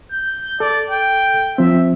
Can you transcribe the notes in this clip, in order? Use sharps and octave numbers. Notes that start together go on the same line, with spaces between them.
G6
A4 D5
G5
F3 C4 E5